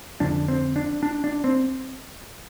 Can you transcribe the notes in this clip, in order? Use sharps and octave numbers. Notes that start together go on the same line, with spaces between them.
F2 D3 D4
C4
D4
D4
D4
C4